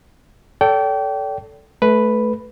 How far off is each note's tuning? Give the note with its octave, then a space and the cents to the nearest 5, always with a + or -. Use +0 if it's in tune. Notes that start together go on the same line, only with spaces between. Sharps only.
A4 +0 D5 -40 G5 -20
A3 -20 B4 +0